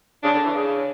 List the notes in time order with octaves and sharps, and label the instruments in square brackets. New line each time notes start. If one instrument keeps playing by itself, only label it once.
[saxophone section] C#3 [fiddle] D4
[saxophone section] D3
E3
C#3